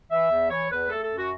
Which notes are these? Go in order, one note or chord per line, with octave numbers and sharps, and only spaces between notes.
E3 E5
E2
E3 C#5
E2 B4
A3 A4
A4
F#2
F#4